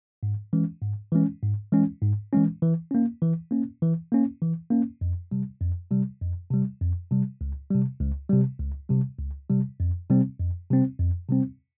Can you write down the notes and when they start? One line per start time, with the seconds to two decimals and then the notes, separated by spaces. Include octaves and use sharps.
0.23 G#2
0.53 E3 G#3 C#4
0.82 G#2
1.12 E3 G#3 C#4
1.42 G#2
1.72 E3 G#3 C#4
2.01 G#2
2.32 E3 G#3 C#4
2.62 E3
2.91 A#3 C#4
3.22 E3
3.51 A#3 C#4
3.82 E3
4.12 A#3 C#4
4.42 E3
4.71 A#3 C#4
5.01 F2
5.31 C3 G3
5.60 F2
5.91 C3 G3
6.21 F2
6.51 C3 G3
6.81 F2
7.11 C3 G3
7.41 C#2
7.70 C3 G3
8.00 C#2
8.30 C3 G3
8.60 C#2
8.89 C3 G3
9.19 C#2
9.49 C3 G3
9.80 F2
10.10 C3 G3 C4
10.39 F2
10.70 C3 G3 C4
10.99 F2
11.29 C3 G3 C4